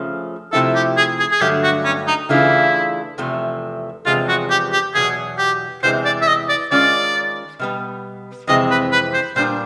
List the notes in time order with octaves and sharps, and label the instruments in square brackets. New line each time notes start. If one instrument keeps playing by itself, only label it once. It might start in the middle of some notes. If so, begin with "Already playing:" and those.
Already playing: [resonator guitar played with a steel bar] C#3 F3 A3 C#4
[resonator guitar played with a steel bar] C3 F3 A3 C4 E4 [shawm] A4
[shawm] G4
G#4
G#4
G#4
[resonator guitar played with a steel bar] G2 D3 F#3 A3 [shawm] G4
[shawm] F#4
C#4
D#4
[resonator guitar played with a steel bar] C#3 E3 A3 D4 F4 [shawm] E4
[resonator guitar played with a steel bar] E2 C3 F3 A3
[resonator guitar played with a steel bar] E2 C3 F3 G#3 [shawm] F4
[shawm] F#4
G4
G4
[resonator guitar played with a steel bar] E2 B2 F#3 [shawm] G#4
[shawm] G4
[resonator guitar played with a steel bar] E2 C3 E3 G#3 [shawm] C5
[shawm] D5
E5
D#5
D5
[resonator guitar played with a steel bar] D#3 G#3 C#4 F4 [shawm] D5
[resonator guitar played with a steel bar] B2 G3 B3
[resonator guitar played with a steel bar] F2 C3 E3 G#3 C4 [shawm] D#5
[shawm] B4
B4
C5
[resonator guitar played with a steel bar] A#2 G3 B3 D4 [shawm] C5